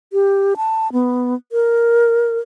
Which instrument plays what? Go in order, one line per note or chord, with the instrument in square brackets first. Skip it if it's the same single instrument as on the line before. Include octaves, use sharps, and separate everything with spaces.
[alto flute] G4
A5
B3
A#4